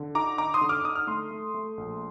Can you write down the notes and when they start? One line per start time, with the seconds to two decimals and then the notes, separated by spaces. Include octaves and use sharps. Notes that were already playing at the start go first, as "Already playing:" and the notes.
Already playing: D3
0.15 D#4 A#5 D6
0.38 D#4 A#5 D6
0.54 C6 D#6
0.61 D3
0.69 D6 F6
0.85 D#4 D#6
0.96 F6
1.07 A3 C6 D#6
1.31 A3
1.55 A3
1.77 A#1